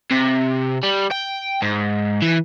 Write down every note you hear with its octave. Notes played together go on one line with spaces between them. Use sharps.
C3
G3
G5
G#2
E3